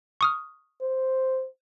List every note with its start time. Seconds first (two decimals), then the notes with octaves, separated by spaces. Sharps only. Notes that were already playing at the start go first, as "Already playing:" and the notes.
0.21 C#6 D#6 F6
0.81 C5